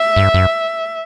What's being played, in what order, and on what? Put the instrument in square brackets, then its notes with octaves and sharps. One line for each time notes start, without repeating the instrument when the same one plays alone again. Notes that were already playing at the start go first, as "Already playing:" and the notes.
Already playing: [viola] E5
[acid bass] G2
F#2